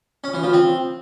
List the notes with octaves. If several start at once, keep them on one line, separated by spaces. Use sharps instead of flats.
C#4
E3
F3
C4